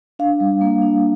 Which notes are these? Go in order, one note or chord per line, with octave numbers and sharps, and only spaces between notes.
D4 F5
G3
A#3
D4